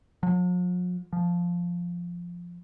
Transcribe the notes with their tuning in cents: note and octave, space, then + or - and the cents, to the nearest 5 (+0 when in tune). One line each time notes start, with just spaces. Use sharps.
F3 +45
F3 +0